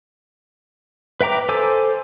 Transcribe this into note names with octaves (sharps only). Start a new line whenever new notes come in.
B4 E5 G5 A#5 D6
A4 C5 G#5 D6 E6